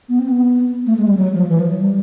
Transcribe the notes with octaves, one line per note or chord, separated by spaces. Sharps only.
B3
C4
B3
A3
G#3
G3
F#3
F3
E3
F3
F#3
G3